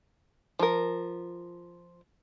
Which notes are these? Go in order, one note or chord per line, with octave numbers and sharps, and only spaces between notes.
F3 A#4